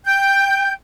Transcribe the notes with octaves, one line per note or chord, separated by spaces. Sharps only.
G5 G6